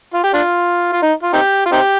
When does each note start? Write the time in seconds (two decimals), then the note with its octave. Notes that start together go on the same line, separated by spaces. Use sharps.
0.14 F4
0.24 G4
0.34 D4 F4
0.93 F4
1.02 D#4
1.23 F4
1.33 C4 D#4 G4
1.66 F4
1.72 C4 D#4 G4